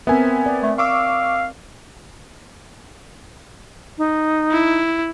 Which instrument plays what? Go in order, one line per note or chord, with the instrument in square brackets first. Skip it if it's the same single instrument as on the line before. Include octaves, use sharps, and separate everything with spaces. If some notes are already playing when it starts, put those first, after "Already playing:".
[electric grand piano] B3 G#5 [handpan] C4 A#4 E5
[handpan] D5
[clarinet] A3
[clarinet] F5 [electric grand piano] C#6 D6 E6
[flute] D#4
[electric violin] E4